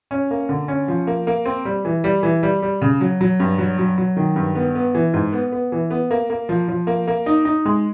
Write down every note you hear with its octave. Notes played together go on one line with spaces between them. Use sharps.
C#4
A#3
D3
C#4
F3
A#3
A#3
C4
G3
E3
G3
E3
G3
G3
C#3
F#3
F#3
G2
F#3
F#3
F#3
D#3
G2
B3
B3
E3
G#2
B3
B3
E3
B3
A#3
A#3
F3
F3
A#3
A#3
D#4
D#4
G#3